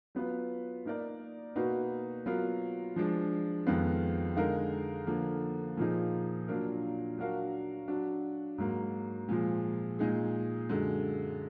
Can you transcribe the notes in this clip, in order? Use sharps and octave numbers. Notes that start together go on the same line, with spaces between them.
F#3 B3 F4 B4
A#3 D#4 A#4 D5
B2 A#3 D#4 F#4 B4
F#3 B3 F4 A#4
F3 G#3 D4
F2 D#3 G#3 B3 F4
D3 G#3 D#4 A#4 F5
D3 F3 A#3
A#2 F3 A#3 D#4 G#4
A#2 F#3 D4 F4 A#4
F#3 D4 F#4 A#4 F5
F#3 D4 F#4
G#2 F#3 A#3
A#2 F3 G#3
A#2 G#3 D#4 G#4
F#2 D3 G#3